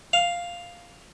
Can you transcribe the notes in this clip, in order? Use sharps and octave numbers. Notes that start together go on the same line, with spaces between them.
F5